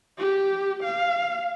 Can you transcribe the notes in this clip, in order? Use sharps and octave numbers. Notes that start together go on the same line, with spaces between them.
G4
F5